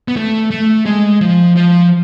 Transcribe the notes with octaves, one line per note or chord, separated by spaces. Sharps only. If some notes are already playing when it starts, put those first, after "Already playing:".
B3
A3
A3
G#3
F3
F3